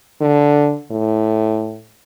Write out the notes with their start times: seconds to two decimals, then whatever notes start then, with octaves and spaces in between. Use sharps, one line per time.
0.21 D3
0.91 A2